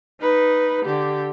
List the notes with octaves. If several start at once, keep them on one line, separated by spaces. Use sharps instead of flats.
D#4 B4
D3 G4